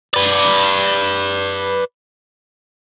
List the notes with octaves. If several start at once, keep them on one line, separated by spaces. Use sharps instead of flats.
B4 D5